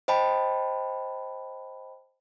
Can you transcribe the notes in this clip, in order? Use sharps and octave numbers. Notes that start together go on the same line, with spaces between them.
C5 D#5 G5 A5 B5